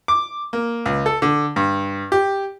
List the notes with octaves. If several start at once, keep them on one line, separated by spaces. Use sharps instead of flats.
D6
A#3
C#2
A4
D3
G2
G4